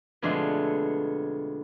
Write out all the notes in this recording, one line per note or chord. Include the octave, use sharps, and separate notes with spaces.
F2 B2 D3 G#3 A3